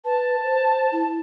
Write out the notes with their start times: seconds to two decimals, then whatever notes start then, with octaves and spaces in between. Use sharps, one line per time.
0.05 B4 A5
0.44 C5
0.92 E4